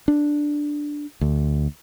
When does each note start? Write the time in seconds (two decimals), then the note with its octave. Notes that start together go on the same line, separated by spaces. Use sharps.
0.08 D4
1.21 D2